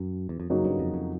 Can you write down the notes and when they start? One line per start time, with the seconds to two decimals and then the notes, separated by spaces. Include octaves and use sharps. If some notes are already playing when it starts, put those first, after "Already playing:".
Already playing: F#2
0.29 E2
0.40 F2
0.50 F#2 C#3 F#3 A#3 D#4 F#4
0.65 G2
0.79 F2
0.94 F2